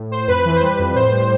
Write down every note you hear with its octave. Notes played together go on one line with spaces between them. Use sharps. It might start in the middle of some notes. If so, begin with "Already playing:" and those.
Already playing: A2
A2 C5
F2 B4
E3
C5
G3 B4
F2
A2 C5
G3